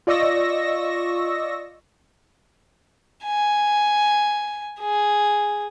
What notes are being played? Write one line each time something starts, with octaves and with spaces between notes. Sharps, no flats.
F4 D5 D#5 C#6 E6 A#6
G#5
G#4